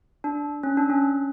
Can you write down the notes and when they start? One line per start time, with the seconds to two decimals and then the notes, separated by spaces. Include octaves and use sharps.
0.24 D4
0.63 C#4
0.77 D4
0.90 C#4